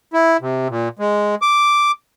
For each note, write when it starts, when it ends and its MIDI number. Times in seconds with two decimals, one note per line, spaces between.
0.13 0.37 64
0.41 0.68 48
0.69 0.88 46
0.99 1.35 56
1.42 1.91 86